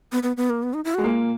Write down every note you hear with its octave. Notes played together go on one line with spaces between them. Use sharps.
B3
B3
B3
A#3
B3
D#4
E4
F#4
G#3
A#2 A#3